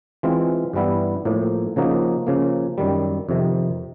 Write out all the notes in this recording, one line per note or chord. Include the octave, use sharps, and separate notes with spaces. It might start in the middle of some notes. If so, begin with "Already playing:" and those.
E3 G#3 C4 F4
G2 E3 G3 B3 E4
A2 F3 A#3
C#3 F3 A#3 D#4 F#4
C#3 F3 A#3
F#2 D#3 G3
F2 C3 D#3